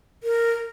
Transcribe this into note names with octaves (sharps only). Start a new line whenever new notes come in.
A#4